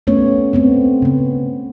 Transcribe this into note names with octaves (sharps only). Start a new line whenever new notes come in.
A3 B3 C#4 C#5
A3 B3 C4
C#3 B3